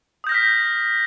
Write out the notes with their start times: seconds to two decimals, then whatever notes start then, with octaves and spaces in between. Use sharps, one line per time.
0.24 D#6
0.27 G6
0.29 A#6
0.32 F6
0.34 B6